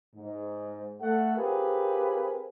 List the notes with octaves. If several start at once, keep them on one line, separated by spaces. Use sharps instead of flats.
G#2
A3 A4 F#5
C4 F4 G4 G#4 A#4 B4